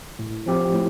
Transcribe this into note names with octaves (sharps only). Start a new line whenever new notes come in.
A2
F3 C4 G4
A2